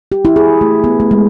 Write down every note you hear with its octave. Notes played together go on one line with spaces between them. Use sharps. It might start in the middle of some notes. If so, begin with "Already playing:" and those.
G4
E4
G#4
A3
B3
A3
G#3